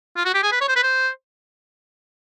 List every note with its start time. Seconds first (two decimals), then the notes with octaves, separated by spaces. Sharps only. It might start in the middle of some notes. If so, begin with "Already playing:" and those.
0.17 F4
0.25 F#4
0.34 G4
0.43 G#4
0.52 B4
0.61 C#5
0.69 C5
0.76 B4
0.83 C5